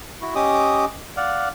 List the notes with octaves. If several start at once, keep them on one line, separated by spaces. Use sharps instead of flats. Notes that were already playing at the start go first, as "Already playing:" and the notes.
E4 F#4
C#4 G4 D#5 D6 D#6
D5 F5 F#5